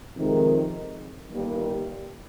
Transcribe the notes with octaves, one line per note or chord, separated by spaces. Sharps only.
F2 C3 D#3 G#3
G1 G2 D#3 G3 A#3